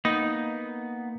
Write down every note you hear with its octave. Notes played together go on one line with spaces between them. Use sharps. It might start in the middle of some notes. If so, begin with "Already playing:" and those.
A#3 B3 D#4 B5